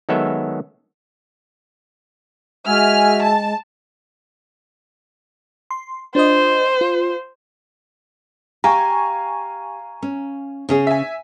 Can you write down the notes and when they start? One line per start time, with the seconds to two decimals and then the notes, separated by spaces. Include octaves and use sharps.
0.09 D#3 F#3 G#3 B3 A4 E5
2.66 G#3 F#4 E5 G#5 F6
3.23 A5
5.71 C6
6.15 D4 F4 C5 D#5
6.81 F4
8.64 G4 F5 G#5 A#5 C#6
10.02 C#4
10.69 C#3 C#4 G#4
10.87 E5 G#5